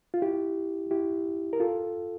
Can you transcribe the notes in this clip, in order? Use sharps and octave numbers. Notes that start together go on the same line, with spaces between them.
F4
E4 G4
E4 G4
A#4
F4 A4